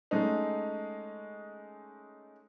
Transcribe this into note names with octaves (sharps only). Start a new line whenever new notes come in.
G#3 A3 C#4 D#4